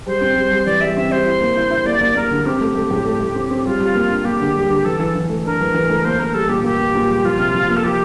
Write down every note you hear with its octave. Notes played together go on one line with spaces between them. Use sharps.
G3 C5
C4
G3
G3
E3 D5
G3 E5
C4 E5
G3 C5
E4
A#3
E4
E4
A#3 D5
A#3
A#3 A#4
D3
C4 G4
A3
A3
A2
A3
A3
C4
C4
G3 F4
G3
A#3
D4
A#3 G4
D3
G3
D3
E3 A4
E3
E3
A3
D4 A#4
E3
E3
A3
A#3 C5
A#3 A#4
G3 A4
A#2 G4
A#3 G4
A#3
A#2
G3
F3 F4
C3
F3
A#3
A4
F3 G4